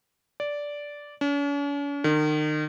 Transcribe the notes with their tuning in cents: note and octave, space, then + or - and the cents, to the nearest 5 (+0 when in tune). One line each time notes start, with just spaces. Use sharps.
D5 -10
C#4 +45
D#3 -35